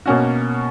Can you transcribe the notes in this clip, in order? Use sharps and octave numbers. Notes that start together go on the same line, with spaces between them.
B2 A#3 C#4 F#4